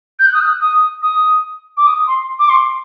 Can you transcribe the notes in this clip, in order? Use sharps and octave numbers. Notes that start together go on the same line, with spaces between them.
G6
F#6
D#6
F#6
D#6
D#6
D6
D#6
C6
D6
C6